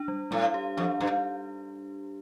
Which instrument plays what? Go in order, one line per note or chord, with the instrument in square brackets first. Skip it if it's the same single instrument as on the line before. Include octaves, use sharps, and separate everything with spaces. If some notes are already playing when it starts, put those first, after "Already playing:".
Already playing: [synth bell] D4
G3
[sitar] A2 [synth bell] G3
[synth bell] G4
[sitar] F2 [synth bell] D4
[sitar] G2 [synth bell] G3